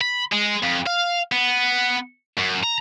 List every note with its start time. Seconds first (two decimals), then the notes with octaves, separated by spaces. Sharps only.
0.01 B5
0.32 G#3
0.63 F2
0.86 F5
1.32 B3
2.37 F#2
2.63 A#5